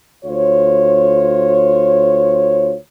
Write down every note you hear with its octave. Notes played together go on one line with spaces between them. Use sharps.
D2 F4 C5 C#5